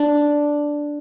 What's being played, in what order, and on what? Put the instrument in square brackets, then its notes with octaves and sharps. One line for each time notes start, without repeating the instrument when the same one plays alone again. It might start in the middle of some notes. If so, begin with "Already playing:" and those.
Already playing: [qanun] D4